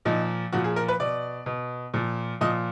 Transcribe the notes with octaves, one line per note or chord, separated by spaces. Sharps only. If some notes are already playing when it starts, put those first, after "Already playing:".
A#2 F3 D#4
A#2 F3 F#4
G#4
A#4
B4
B2 D5
B2
A#2 F3
A#2 F3 D#5